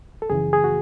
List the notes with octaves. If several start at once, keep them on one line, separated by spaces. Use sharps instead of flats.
A4
F#2 C#3 E3 G#4
G#4
F#4